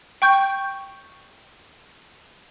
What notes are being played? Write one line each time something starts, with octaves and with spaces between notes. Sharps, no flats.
G5 C#6 G6